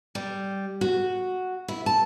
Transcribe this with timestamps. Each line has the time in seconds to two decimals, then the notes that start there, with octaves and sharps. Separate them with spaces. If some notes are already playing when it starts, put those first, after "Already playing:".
0.15 G3
0.81 F#4
1.68 E4
1.86 A5